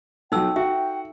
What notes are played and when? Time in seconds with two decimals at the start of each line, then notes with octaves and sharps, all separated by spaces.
0.32 B1 F#3 D#4 A4 G5 E6
0.56 F#4 E5 G5